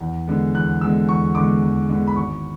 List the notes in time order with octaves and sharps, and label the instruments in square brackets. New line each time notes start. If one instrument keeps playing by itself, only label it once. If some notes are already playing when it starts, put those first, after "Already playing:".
[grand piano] E2
D3 G#3 B3
E2 F#6
D3 G#3 B3 E6
E2 C#6
D3 G#3 B3 D6
E2
D3 G#3 B3
B5
G#1 C#6